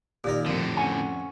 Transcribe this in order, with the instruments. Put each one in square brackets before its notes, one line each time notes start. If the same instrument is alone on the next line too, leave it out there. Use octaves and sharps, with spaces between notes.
[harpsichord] A#2 D#3 A#4 [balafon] G4 D5
[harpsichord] F2 [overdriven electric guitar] A2 D3
[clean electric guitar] C#4 F#5 G#5